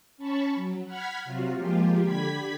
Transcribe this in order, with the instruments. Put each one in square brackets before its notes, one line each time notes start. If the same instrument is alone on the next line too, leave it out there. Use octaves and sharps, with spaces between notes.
[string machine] C#4 A5 B5 C#6
F#3
F#5 B5 F6 G#6 B6
C3 F#3 F4 F#4
F3 G#3 A#3 F4 G4
D3 G4 B5 G#6 B6